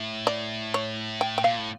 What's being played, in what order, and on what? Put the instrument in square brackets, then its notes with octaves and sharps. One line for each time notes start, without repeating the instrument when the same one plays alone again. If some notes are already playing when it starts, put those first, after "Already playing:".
Already playing: [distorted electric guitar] A2
[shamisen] D5
C#5
G5
G5
[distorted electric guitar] A#2 [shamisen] F5
[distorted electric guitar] A2